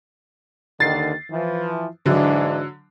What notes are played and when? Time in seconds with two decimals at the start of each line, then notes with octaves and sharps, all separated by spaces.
0.80 D#2 D3 D#3 A6 C7
1.30 E3 F3
2.06 G#2 D3 E3 F#3 D4